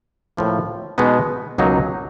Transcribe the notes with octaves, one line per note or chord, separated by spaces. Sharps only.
A2 F3 A#3
B2 G#3 B3 D#4
C#2 B2 F#3 A#3 D#4